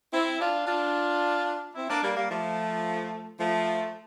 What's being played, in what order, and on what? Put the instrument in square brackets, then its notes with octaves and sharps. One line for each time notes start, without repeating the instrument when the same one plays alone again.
[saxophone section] C4 E4
D4 F4
D4 F4
C4 E4
A#3 D4
G3 A#3
G3 A#3
F3 A3
F3 A3